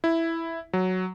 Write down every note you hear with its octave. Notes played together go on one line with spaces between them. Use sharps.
E4
F#3